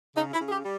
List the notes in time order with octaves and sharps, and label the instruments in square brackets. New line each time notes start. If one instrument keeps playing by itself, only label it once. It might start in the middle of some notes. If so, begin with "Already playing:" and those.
[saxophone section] C#3 D#4
E4
C#3
G#4
G4
G3